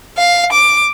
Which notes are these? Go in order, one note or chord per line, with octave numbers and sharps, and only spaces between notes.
F5
D6